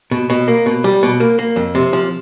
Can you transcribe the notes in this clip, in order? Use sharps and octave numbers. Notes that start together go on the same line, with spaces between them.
B2
B2
A#3
B2
G3
B2
A#3
A#3
F2
C3
F3